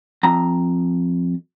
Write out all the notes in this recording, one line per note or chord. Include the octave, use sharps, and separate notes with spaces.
F2 A#5